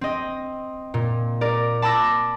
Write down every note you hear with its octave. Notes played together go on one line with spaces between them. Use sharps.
C4 D#5
A#2
A#4 D5
A5 B5 D6 E6 A#6